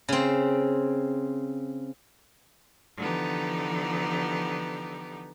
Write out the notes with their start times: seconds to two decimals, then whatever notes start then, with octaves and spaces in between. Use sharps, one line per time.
0.09 C#3 C4
2.99 D3 E3 F3 B3 D#4 G4